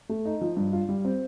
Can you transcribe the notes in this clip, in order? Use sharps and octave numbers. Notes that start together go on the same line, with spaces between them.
A3
D#4
F3
G2
F4
G3
C4